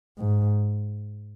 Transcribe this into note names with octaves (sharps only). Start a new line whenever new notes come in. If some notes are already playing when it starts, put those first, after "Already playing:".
G#2